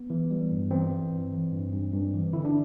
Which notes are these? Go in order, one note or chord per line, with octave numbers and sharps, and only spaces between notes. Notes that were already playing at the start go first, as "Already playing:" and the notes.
Already playing: B3
E3
G3
G2
E3 C4
E3
G2
E3
G2
G2
G2
E3
D3 E4
D4